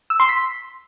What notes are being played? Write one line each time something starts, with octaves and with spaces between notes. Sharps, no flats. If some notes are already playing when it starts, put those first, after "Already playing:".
E6
C6
B6